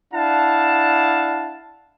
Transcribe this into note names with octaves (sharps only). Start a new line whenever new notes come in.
D4 E4 F5 F#5 A5